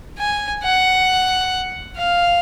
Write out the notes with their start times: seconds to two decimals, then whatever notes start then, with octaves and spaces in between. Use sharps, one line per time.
0.18 G#5
0.63 F#5
1.97 F5